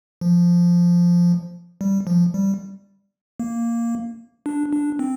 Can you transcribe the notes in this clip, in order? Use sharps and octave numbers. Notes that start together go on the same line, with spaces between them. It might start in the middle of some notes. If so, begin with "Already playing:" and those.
F3
G3
F3
G3
A#3
D4
D4
C4